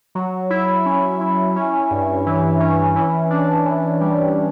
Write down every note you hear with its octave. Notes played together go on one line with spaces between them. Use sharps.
F#3
E4
C#4
E4
C#4
G2
E3
C#4
E3
D4
E3
G3